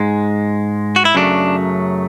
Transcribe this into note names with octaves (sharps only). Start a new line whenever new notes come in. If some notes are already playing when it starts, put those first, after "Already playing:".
Already playing: G#2 G#3
F#4
E4
F#2 C#3 F#3 A3 D4